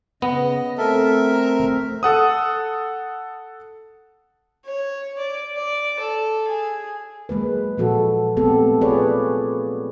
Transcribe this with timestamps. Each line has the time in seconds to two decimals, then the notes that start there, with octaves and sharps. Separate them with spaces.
0.22 C#3 B3 D#5
0.78 A3 C4 A4 A#4 E5
1.33 A#5
2.03 A4 F#5 D#6
4.65 C#5
5.19 D5
5.57 D5
6.00 A4
6.48 G#4
7.29 F#3 G#3 A#3 B4
7.78 A#2 F3 F#4 A4
8.37 A3 B3 C4 G4 A4
8.81 F4 G#4 B4 C#5 D5